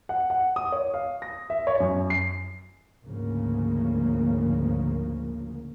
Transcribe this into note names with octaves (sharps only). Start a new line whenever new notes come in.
F#5
F#5
D#6
C#5
F5
A#6
E5
C#5
F#2
C7
D2 G#2 C#3 F3 A#3